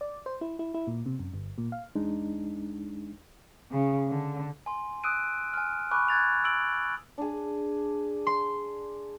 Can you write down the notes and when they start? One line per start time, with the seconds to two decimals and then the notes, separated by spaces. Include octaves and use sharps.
0.01 D5
0.26 C5
0.41 E4
0.59 E4
0.74 E4
0.87 A#2
1.06 C3
1.19 F#2
1.34 G1
1.58 A#2
1.72 F5
1.95 E2 G#3 D4 D#4
3.70 C#3
4.07 D3
4.66 G#5 C6
5.04 D#6 E6 F#6 D7 D#7
5.53 G#5 F6
5.91 G#5 B5 C#6 D6 F#6
6.08 F#6 G#6 A6 F7
6.44 E6 D7 F#7
7.18 D4 G#4
8.27 C6